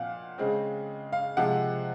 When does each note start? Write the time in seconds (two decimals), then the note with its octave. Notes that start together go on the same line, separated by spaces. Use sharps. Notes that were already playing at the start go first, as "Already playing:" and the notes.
Already playing: A#2 F3 C4 F5 F#5
0.38 C#3 G#3 C4
1.12 F5
1.37 C3 F3 G#3 C4 F#5